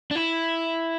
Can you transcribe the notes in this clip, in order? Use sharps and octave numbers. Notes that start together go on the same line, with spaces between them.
D4
E4